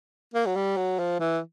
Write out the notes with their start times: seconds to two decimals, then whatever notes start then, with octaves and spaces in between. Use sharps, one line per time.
0.34 A#3
0.46 F#3
0.56 G3
0.77 F#3
0.99 F3
1.20 E3